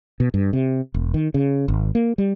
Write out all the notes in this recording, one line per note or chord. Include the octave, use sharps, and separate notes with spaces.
B2
G2
C3
E1
D#3
C#3
G#1
A#3
G3